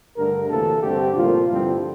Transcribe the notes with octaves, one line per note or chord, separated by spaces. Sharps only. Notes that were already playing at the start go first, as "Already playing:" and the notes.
G2 D3 A3 A#4
D2 C3 E3 A#3 A4
G2 D3 A3 C4 G4
C2 A#2 F3 A#3 F4
G2 D3 F3 C4 E4